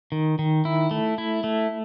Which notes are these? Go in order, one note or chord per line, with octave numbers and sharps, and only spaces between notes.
D#3
D#3
E4
A3
E4
A3